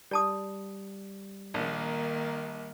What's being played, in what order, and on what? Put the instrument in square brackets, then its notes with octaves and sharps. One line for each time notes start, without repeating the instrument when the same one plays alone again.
[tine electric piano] G3 [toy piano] D5 A5 D#6
[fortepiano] A#1 [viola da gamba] D#3 A#3